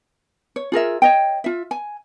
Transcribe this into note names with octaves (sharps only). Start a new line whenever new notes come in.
C#5
F4 G#4 A#4 E5
C#5 D#5 G5
F4 E5
G#5